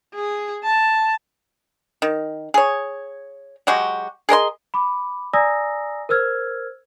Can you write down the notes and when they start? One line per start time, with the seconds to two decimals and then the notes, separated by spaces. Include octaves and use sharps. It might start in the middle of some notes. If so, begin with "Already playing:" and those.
0.14 G#4
0.64 A5
2.02 D#3
2.54 G#4 C#5
3.67 F#3 G#3 F#4 G4
4.29 G#4 A#4 D#5 C6
4.74 B5 D6
5.33 D5 G#5 A#5 D#6 E6 A#6
6.09 A#4 C5 E6 F6 G#6